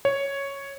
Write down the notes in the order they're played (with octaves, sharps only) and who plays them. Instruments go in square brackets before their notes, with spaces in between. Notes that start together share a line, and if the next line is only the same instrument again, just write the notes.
[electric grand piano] C#5